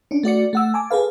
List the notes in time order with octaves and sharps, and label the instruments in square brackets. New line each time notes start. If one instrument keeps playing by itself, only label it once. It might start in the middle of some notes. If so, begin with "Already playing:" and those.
[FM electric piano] C#4 D4
A3 F#4 D5 C#7
A3 F#5 E6
G#5 A5 D6
G#4 A4 B4 F5